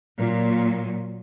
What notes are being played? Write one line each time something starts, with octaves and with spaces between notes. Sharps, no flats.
A#2 F#3